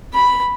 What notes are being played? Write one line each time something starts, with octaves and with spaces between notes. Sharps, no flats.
B5